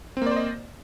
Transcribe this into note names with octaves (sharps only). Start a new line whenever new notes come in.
A#3 C4 C5 D5 D#5